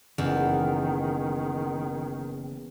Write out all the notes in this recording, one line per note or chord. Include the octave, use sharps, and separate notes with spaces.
F#1 E2 D#3